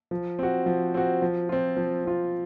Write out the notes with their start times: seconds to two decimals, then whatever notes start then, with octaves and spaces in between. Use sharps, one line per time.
0.11 F3
0.39 C4 F#4
0.66 F3
0.94 C4 F#4
1.22 F3
1.49 C4 F4
1.77 F3
2.05 C4 F4